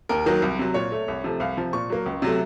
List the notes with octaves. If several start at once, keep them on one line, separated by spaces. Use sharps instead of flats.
D#2 A#4
D#3 F#3 A#3
C2
C3 F#3
A#2 C#5
A3
C2
C3 F3 A3
C2 F5
C3 F3
A#2 C#6
F#3 A#3
C#2
C3 F#3 A3